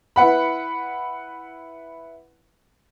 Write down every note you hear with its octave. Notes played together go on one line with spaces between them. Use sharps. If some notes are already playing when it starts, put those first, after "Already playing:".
E4 B4 F#5 B5